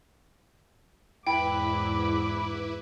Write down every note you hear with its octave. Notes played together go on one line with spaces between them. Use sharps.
E2 G#2 E4 B4 G5 B5 D6